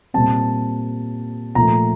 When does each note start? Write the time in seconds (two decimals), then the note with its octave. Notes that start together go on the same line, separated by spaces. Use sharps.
0.14 A#2 G3 C4 A5
1.55 A#2 F3 A3 A#5